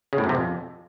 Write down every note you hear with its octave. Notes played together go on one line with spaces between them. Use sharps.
C#3
A2
F#2
C3
F2